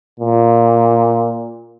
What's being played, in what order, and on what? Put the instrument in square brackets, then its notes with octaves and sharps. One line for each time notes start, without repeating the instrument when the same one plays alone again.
[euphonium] A#2